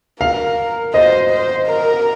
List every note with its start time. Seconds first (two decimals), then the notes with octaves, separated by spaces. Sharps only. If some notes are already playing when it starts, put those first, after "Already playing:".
0.21 A#4 F5
0.94 C5 D#5
1.30 C5
1.67 A#4